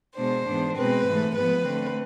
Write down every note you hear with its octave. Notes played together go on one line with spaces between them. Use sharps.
B2 G#3 B3 D4 C5
G#2 E3 B3 D4
B2 G#3 C4 B4
G#2 E3 A3
G#2 F3 B3 B4
D3 A3 C4